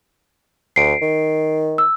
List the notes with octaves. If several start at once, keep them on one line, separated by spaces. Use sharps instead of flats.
D2 C7 D7
D#3
E6